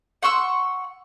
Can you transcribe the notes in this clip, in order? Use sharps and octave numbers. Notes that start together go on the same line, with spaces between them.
F#5 C6 C#6 E6